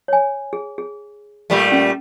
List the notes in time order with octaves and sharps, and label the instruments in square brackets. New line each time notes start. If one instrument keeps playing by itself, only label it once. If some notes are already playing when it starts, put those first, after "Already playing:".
[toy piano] C#5 G#5
G#4
G#4
[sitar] A#2 G3 A3
[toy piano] C#4